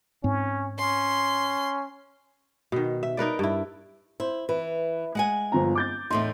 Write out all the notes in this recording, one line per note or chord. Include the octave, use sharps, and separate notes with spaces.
G#2 C4 C#4
C#4 C6
B2 D#3
E5
D#4 A#4 B4 D5
G2 E4
E4 C5
E3 B4
G#3 F#5 G#5
G1 F3 A#5
D6 G6 A6
E2 A2 D#4 C6